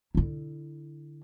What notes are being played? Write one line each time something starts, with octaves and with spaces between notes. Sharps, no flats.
D3 E4